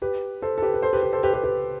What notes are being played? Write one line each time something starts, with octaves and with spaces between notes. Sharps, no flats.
G4 B4
A4 C5
A4
G4 B4
B4
A4 C5
G4 B4
G4 B4
A4 C5
G4 B4
G4 B4
G4 B4